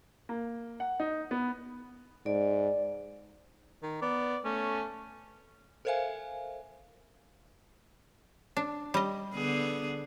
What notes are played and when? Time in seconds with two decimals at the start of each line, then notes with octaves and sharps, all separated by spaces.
0.29 A#3
0.80 F#5
1.00 D#4
1.31 B3
2.26 G#2 D5
3.83 D#3
4.02 B3 D5
4.45 A3 C#4
5.85 A4 A#4 C5 E5 F5 G#5
8.57 D4
8.94 G3 D#5
9.34 D3 B3 G#4